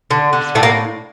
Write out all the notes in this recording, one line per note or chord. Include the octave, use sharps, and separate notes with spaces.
D3
D3
A2 A3
A#3